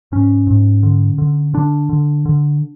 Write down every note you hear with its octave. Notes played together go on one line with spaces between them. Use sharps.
G#2 C#4
G#2
D3
D3
D3 D4
D3
D3